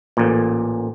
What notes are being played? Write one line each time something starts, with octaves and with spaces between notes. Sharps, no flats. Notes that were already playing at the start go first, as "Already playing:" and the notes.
A1 A#2